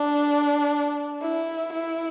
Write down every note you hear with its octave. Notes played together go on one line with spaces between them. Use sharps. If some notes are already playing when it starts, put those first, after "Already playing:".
Already playing: D4
E4
E4